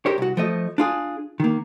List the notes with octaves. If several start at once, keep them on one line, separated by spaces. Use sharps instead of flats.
G4 A#4 C5 C#5
C2 F#4
F3 A3 D#5
D4 F4 G#4
D#3 A#3